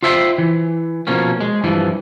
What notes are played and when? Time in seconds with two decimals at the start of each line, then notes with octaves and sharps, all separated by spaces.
0.03 F4 C5 E5 G5 G#5 C6
0.38 E3
1.07 B2 F3 A#3 C#4
1.41 G#3
1.64 G2 E3 F3